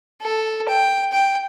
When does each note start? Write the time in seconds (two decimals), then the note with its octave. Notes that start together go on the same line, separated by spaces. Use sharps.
0.21 A4
0.68 G5
1.13 G5